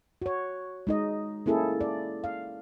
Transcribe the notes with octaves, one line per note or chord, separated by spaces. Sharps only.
F#4 C#5
G#3 D#4 D#5
A#3 C#4 E4 G#4 A4
D5
F5